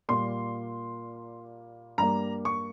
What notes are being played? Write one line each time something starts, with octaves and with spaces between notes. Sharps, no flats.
A#2 G3 A#3 C6
G2 G3 A#3 A#5
C#6